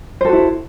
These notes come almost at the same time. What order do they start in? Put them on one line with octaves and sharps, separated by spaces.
C5 A4 F#4 E4